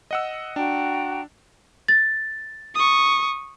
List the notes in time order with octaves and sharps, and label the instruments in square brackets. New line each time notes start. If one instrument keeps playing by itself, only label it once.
[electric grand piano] D#5 F#5 E6
[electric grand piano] D4 [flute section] F#4 G5 A#5
[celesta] A6
[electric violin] C#6 D#6